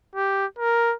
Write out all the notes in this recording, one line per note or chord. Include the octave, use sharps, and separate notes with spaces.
G4
A#4